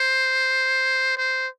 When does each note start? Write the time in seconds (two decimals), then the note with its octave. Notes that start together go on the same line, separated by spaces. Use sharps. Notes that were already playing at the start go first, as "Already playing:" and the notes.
Already playing: C5
1.18 C5